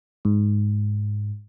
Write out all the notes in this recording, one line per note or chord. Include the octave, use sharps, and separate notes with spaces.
G#2